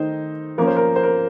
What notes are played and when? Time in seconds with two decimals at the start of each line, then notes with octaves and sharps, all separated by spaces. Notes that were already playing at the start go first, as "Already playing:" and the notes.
Already playing: D#3 A3 D#4 C5
0.58 F3 A#3 C#4 A#4
0.67 C5
0.77 A#4
0.96 C5
1.03 A#4